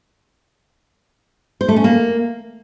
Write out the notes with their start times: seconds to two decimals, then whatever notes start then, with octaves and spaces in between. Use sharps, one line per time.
1.61 C5
1.69 A3
1.76 C#4
1.84 A#3